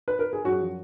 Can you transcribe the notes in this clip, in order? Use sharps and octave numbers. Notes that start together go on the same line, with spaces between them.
B4
A#4
G#4
F#2 F#4
F3